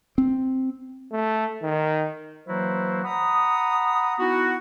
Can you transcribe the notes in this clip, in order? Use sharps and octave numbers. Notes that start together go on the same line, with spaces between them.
C4
A3
D#3
E3 F#3 A#3 E4 F#4 C5
F#5 A#5 B5 D#6
B3 D#4 E4 F#4